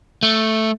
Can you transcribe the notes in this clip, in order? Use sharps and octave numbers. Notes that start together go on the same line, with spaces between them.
A3